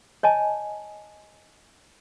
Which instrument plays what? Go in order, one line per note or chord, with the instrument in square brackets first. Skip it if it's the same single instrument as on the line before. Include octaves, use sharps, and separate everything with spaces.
[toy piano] C#5 D#5 G#5 A5